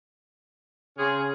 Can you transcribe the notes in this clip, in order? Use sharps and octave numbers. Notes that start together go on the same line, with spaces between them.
C#3 C4 C#4 G#4